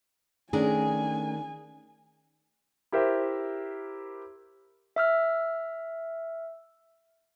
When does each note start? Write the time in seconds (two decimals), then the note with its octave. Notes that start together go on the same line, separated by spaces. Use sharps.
0.53 D#3 A3 C#4 D4 G#4 A#4 G#5
2.92 E4 G4 A#4 C5 E5
4.96 E5 E6 F6